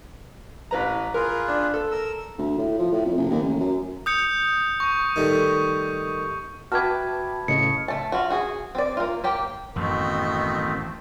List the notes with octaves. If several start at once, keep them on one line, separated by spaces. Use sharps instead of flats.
A1 B4 A#5
F4 G#4 A#4 B4
D4
A4
A#4 E6
D2
A2
F3
A2
F2
F#1
D#2
A1
F#2
D#6 G6 C#7
C#6
D#3 G3 A3
F#4 B4 E5 G5 A5 D6 F6 G#6
A2 C#3 D#5 C#6 C#7
A3 A5
F4 F#4
F#4 G#4
C4 D5
A#3 F4
A#3 G4 G5
A1 F#2 B2 D#3 A3 C4